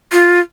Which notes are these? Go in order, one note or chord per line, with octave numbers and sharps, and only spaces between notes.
F4